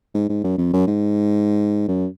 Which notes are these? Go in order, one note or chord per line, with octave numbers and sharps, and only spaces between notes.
G#2
G#2
F#2
F2
F#2
G#2
F#2